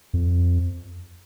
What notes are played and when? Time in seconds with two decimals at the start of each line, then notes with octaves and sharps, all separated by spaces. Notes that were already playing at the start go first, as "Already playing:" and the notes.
0.13 F2